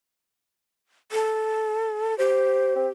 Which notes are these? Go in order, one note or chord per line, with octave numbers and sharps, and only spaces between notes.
A4
G4 C5
C4